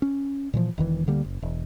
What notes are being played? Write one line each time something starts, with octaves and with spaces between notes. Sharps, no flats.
C#4
A#2 E3 F3
E1 D#3 E3
D2 D3 G3 A#3
F#1
E1